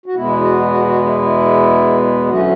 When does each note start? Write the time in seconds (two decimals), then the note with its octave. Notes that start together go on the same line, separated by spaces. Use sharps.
0.06 F#4
0.14 E2 B2 G#3 B3 E4
0.41 F#4
0.69 F#4
0.86 F#4
1.04 E4
1.22 E4
2.25 E4
2.29 D2 D3 F#3 A3 C#4 F#4